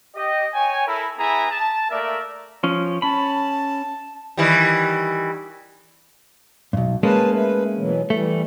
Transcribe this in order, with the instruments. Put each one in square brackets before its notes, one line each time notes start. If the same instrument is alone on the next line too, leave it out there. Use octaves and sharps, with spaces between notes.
[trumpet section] G4 D#5
C#5 G5 G#5
E4 A4 A#4 E5 B5
B3 E4 G#4 G#5 A#5
A5
A3 A#3 A#4 D5 E5
[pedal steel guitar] F3 C#4
[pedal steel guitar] C#4 B5 [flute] A5
[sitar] D#3 E3 G3
[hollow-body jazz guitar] B1 G2
[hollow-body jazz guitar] G#3 A#3 C#4 [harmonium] B4 A5
[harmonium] A3 B4
B2 E3 F#3
[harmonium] E3 G3 [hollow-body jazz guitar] A3